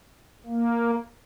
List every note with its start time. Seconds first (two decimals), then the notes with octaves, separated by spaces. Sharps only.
0.46 A#3